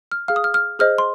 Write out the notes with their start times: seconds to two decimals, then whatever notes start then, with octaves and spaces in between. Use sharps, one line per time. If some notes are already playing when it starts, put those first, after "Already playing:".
0.12 F6
0.28 G#4 F5 F6
0.36 D#6
0.44 F6
0.54 F6
0.79 G#4 C5 D#5 F6
0.98 C6